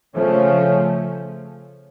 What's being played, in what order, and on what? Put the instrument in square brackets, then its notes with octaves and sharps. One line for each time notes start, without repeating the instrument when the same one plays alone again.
[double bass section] C#3 F3 A3 C#4